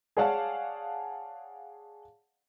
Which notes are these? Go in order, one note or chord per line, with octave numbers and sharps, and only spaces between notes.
G#4 C#5 D5 F5 F#5 A5